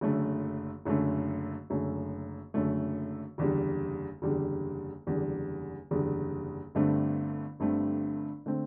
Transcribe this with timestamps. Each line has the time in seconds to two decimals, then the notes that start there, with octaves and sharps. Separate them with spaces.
0.01 F#1 F#2 D3 A3
0.85 F#1 F#2 D3 A3
1.70 F#1 F#2 D3 A3
2.54 F#1 F#2 D3 A3
3.38 F#1 E2 D3 G3
4.22 F#1 E2 D3 G3
5.07 F#1 E2 D3 G3
5.91 F#1 E2 D3 G3
6.75 G1 G2 D3 A3 C4
7.60 G1 G2 D3 A3 C4
8.46 D3 A3 C4